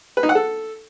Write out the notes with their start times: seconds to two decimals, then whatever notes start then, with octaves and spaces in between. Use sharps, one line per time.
0.17 B4
0.23 D#4
0.29 F#5
0.35 A4